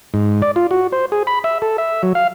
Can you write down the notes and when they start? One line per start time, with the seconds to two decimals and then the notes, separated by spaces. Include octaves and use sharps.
0.14 G#2
0.42 D5
0.56 F4
0.71 F#4
0.92 C5
1.12 G#4
1.27 B5
1.44 E5
1.62 A4
1.78 E5
2.03 F#3
2.15 F5